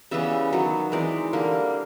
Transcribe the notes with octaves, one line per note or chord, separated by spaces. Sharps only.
C#3 E3 G3 B3 E5
D#3 F#3 B3
E3 G#3 C4 D#4 D5
D3 G3 A#3